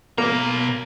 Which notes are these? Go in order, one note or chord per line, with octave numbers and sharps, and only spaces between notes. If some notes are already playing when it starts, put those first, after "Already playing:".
B2 A#3 A#5